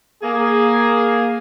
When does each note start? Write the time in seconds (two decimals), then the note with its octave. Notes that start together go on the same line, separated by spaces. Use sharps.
0.23 A#3 G#4